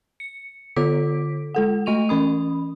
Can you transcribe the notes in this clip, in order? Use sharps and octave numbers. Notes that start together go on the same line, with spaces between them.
C#7
D3 F4 A4 D6 B6 D7
G#3 A4 F#5
A3 D#5 C#6 D#7 F7
E3 C#4 B5 D#6